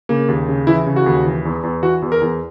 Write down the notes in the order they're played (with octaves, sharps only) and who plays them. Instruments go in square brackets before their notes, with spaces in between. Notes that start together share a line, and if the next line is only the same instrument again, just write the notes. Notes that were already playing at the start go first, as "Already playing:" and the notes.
[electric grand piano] C#3 A#3
D#2
C#3
E3 E4
C#3
F#4
D#2
E3
E2
E2
E3 F#4
E2
A#4
E2